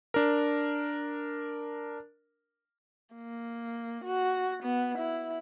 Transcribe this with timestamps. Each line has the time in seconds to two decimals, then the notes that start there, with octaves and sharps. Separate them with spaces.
0.14 D4 A#4
3.15 A#3
4.04 F#4
4.63 B3
4.98 E4